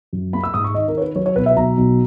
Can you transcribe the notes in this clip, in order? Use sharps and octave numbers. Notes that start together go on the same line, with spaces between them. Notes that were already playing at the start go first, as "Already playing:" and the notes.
F#2
A#3 B5
E6
G#2 D#6
C#6
D#3 D#5
A#4
D#3 C#5
B4
F#3 C#5
C#5
B1 B4
E5
B1 A#5
B1